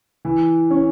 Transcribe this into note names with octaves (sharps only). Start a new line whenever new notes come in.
E3
C#4